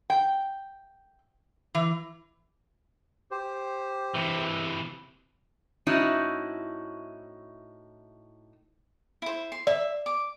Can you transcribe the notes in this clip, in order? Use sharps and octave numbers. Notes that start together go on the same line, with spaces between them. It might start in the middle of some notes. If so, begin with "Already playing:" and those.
G5
E3
G4 C5
C3 E3
A2 C4 C#4 D#4 E4 F#4
E4 C5
C6
D5 E5
D6